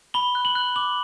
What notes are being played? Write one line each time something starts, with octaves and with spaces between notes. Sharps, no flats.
B5 G7
F#6
F#7
F#6
D6 F#7